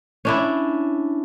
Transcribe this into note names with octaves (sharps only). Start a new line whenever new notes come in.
C#4 D4 E4